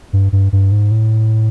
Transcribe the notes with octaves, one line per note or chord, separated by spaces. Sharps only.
G2
G2
G2
G#2
A2